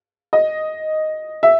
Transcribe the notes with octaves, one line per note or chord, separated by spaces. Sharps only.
D#5
E5